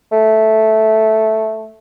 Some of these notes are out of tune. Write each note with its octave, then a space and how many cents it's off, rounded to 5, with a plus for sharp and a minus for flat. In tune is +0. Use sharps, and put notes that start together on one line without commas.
A3 -5